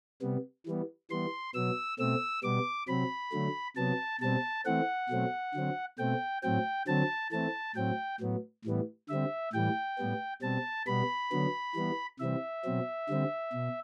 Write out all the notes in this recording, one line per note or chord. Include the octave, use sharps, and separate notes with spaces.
C3 G3 B3
E3 G3 B3
E3 G3 B3 C6
B2 F#3 B3 E6
B2 A3 C4 E6
B2 G3 B3 D6
C3 F#3 C4 B5
D3 F#3 A3
C3 F#3 B3 A5
B2 G3 C4 A5
E3 A3 C4 F#5
B2 F#3 A3 C4
D3 F#3 C4
B2 A3 C4 G5
A2 F#3 C4 G5
D3 F#3 C4 A5
E3 A3 C4 A5
A2 F#3 C4 G5
A2 F#3 B3
A2 E3 G3 B3
D3 G3 C4 E5
A2 E3 G3 G5
A2 G3 B3
B2 G3 C4 A5
B2 G3 B3 B5
D3 F#3 B3
E3 G3 B3
C3 E3 G3 C4 E5
B2 F#3 C4
D3 G3 C4
B2